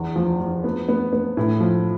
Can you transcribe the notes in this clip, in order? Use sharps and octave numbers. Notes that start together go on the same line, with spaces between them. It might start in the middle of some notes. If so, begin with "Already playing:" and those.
Already playing: E2
F3
F3
B3
B3
B3
A2
F3